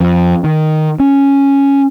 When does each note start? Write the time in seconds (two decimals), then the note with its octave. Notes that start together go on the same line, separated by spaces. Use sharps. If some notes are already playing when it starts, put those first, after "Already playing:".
0.01 F2
0.44 D#3
1.00 C#4